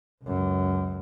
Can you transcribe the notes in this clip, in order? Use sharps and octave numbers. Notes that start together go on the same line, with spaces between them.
C#2 F#2